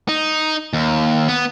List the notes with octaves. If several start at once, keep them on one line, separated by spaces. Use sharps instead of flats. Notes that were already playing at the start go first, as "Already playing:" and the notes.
D#4
D#2
B3